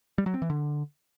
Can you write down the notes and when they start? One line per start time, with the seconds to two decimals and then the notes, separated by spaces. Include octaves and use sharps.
0.18 G3
0.26 F#3
0.34 C4
0.42 E3
0.50 D3